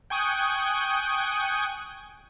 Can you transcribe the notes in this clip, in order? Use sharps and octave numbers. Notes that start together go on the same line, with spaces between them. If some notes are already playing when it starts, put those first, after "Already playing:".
G5 G#5 C#6 D#6 F#6 G6